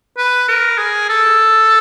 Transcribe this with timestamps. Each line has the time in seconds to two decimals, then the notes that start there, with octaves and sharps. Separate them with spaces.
0.17 B4
0.49 A#4
0.78 G#4
1.09 A4